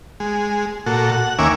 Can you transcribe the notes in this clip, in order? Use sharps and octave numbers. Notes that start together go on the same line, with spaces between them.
G#3
A#2 F#4 A4
F#5
D#2 A#3 C#4 E5 G#5 D6